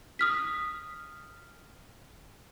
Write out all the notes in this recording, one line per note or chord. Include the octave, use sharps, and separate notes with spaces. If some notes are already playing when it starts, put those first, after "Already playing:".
D#6 F6 B6